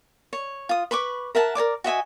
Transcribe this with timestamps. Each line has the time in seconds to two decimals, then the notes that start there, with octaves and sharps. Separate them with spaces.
0.33 C#5
0.69 F4 D#6
0.91 B4 B5 C#6 D6
1.35 A#4 E5 F#5 A5
1.55 A#4 C#5 D5 D6
1.84 F#4 D#5 E5 G#5